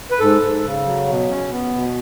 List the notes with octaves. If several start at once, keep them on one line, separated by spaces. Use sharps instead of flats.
B4
G#2 A4
G#2
C#3
F#3
B2
C#4
B3
B2